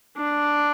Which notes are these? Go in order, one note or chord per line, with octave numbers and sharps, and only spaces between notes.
D4